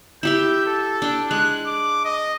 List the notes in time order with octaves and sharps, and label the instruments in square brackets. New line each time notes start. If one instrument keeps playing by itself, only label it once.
[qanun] E4 G4 E5 [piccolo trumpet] G6
[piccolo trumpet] A4
[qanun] D4 G5
[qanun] G#3 [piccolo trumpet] F#6
[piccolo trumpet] D6
D#5